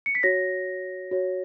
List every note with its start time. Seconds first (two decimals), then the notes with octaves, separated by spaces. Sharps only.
0.06 C#7
0.15 B6
0.23 F#4 C#5 A#6
1.11 F#4 C#5